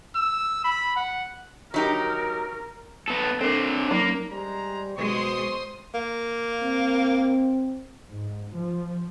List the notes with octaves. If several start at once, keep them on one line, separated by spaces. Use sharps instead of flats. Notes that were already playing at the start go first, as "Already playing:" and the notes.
E6
B5
F#5
F#3 D#4 G4 A#4
B3 A4
C4 D4 A4 A#4
F#3 A#3 C#4 D#4
G3 G#3 C5 A#5
B2 G#3 C5 C6 C#6 D#6
A#3
C4
G#2
F3